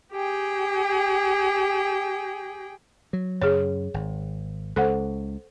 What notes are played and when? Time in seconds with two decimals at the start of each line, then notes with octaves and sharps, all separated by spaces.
0.12 G4 G#4 G5
3.13 F#3
3.41 F#2 C#3 G#4 C#5
3.94 G#1
4.76 C#2 A4 C5 F#5